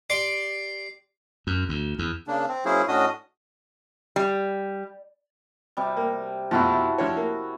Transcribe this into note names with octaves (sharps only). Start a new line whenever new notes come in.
G4 D5 C6 C7
F#2
D2
E2
C#3 A#3 D4
C4
F#3 A#3 C#4 E4 G#4 C5
A2 C#4 D4 F#4 D#5 D#6
G3
C3 G3
A#3
F2 B2 F3 E4 F#4 A5
F3 D4 C#5
A#3